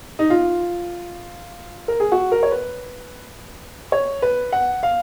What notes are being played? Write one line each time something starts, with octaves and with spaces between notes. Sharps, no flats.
D#4
F4
A#4
G#4
F#4
A#4
C#5
B4
C#5
B4
F#5
F5